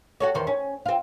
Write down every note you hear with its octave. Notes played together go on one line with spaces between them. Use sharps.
F#4 A4 C#5
E2 D#3 C5
C#4
C4 F4